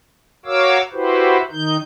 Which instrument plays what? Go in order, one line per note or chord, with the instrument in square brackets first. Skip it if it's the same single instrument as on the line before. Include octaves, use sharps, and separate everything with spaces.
[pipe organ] F#4 A#4 C#5 F5 D6 E6
E4 F#4 G4 B4 C5
D#3 D#4 G6